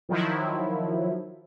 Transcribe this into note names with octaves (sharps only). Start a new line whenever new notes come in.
D#3 F3 F#3 E4